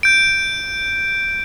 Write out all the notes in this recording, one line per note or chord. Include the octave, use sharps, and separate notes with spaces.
G6 D7